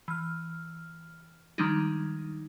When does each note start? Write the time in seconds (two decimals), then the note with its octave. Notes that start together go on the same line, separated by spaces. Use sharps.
0.08 E3 F6
1.58 D#3 F3 G3 G#3 D4 D#4